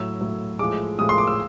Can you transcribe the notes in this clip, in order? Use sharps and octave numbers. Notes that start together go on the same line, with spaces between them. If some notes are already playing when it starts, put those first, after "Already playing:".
Already playing: A2 F#3 E6
A2 F#3
A2 F3 G#3 D6
A2 F3 G#3 D#6
C6
D6
E6